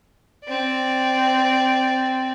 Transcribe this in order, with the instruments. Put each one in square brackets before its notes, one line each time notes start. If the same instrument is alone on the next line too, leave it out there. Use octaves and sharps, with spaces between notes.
[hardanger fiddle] C4 D5